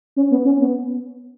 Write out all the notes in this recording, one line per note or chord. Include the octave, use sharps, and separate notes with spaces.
C#4
B3
C#4
B3